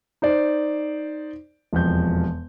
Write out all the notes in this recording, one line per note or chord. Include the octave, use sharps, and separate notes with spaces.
D#4 C5 D5
E1 F2 G6